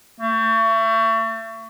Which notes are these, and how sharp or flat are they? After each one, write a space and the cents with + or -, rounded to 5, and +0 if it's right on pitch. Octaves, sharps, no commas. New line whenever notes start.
A3 +35